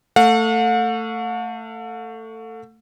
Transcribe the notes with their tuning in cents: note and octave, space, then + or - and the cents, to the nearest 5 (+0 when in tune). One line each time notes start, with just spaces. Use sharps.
A3 +20 F#5 -45